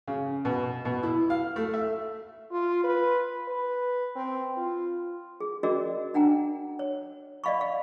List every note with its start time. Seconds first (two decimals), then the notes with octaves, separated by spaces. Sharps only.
0.08 C#3
0.45 B2
0.85 B2
1.03 E4
1.30 F5
1.56 A3
1.74 E5
2.51 F4
2.84 B4
3.48 B4
4.16 C4
4.57 F4
5.40 G#4
5.63 C#4 F#4 G#4 A#4 D5 D#5
6.14 D4 F#5 G5 A#5
6.79 C#5
7.44 D5 D#5 F5 B5 C#6
7.61 F5